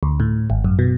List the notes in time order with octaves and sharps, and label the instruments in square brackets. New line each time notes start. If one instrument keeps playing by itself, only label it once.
[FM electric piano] D2
A2
G#1
F#2
B2